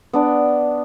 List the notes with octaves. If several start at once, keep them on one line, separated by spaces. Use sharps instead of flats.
B3 D4 D6